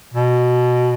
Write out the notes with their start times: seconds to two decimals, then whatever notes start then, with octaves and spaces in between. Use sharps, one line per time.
0.14 B2